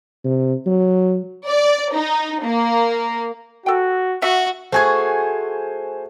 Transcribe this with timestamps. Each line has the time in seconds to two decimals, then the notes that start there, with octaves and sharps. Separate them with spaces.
0.25 C3
0.66 F#3
1.47 D5
1.94 D#4
2.43 A#3
3.66 F#4 A4 G5
4.22 F#4 E5 F#5 C#6
4.72 A3 F#4 G#4 C5 G#5 G#6